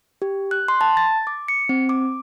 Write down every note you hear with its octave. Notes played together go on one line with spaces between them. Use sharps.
G4
F#6
C6
A5
A6
D6
C#7
C4
D6